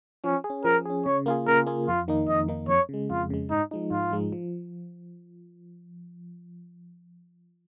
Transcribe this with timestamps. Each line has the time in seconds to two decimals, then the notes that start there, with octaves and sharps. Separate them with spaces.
0.24 F3 C#4
0.44 G#4
0.50 C#4
0.65 F3 A#4
0.85 C#4 G#4
1.06 C#3 C#5
1.26 A#3 F4 G#4
1.47 C#3 A#4
1.67 A#3 F4 G#4
1.88 F2 F4
2.08 D#3 A#3 D#4
2.28 F2 D#5
2.48 D#3 A#3 D#4
2.68 F2 C#5
2.89 C#3 G#3
3.10 F2 F4
3.30 C#3 G#3
3.51 G#2 D#4
3.71 F3 G#3 D#4
3.91 G#2 F4
4.12 F3 G#3 D#4
4.32 F3